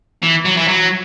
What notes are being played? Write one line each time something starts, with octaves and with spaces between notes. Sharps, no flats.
E3
F#3
E3
F#3